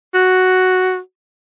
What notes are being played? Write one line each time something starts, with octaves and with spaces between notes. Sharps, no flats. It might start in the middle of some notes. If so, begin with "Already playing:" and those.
F#4